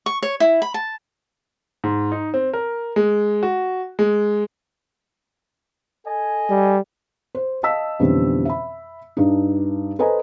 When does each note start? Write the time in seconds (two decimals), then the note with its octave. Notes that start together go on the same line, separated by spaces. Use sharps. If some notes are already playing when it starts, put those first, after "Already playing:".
0.06 C#6
0.22 C#5
0.40 E4
0.62 B5
0.74 A5
1.84 G#2
2.12 D#4
2.34 C4
2.53 A#4
2.96 G#3
3.43 F#4
3.99 G#3
6.06 A4 D#5 G#5
6.50 G3
7.35 C5
7.63 D#5 F5 A5 E6 B6
7.99 F2 B2 D3 E3 G3 C#4
8.45 E5 B5
9.17 G2 D4 D#4
9.99 A4 B4 C5 D#5 G#5 A#5